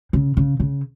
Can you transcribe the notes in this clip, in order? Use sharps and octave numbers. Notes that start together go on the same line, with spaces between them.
C#3
C#3
C#3